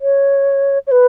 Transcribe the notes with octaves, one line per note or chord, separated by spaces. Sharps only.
C#5
C#5
B4